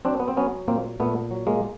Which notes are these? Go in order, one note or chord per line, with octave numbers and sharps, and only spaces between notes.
F#3 C4 D4
B3
C4
F#3 B3 C#4
A#2 A#3 C4
A#2 A3 B3
F#3
G#3 A#3